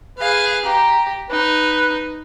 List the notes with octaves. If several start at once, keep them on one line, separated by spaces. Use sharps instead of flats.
G#4 B4 F5
G4 A#5
D#4 B4